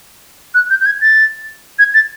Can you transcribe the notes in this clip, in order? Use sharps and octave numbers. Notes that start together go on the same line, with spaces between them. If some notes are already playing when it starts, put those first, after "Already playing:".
F#6
G6
G6
G#6
A6
G#6
A6